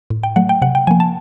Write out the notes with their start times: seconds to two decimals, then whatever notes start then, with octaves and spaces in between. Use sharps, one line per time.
0.10 A2
0.23 G5
0.36 F#3 A3 F#5
0.49 G5
0.62 C3 F#5
0.75 G5
0.87 F3 A#3 G#5
1.00 A5